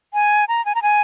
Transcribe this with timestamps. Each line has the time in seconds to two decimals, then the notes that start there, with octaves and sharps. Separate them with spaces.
0.14 G#5
0.48 A#5
0.66 G#5
0.75 A#5
0.83 G#5